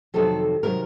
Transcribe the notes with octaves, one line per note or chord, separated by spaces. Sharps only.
F2 C3 D#3 F#3 A4
C3 D#3 F#3 A#4